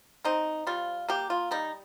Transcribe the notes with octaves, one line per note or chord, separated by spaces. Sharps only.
C4 D#4
G3 F4
A#3 G4
F4
G3 D#4